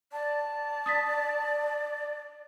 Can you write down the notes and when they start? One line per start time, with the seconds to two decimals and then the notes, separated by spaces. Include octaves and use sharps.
0.12 D5 A5
0.86 D#6 A6 B6